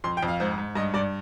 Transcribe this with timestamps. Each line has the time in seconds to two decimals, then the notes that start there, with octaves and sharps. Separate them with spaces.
0.04 F2 C6
0.17 G5
0.23 F2
0.28 F5
0.40 G#2 C5
0.58 G#2
0.76 G2 D#5
0.94 G2 D5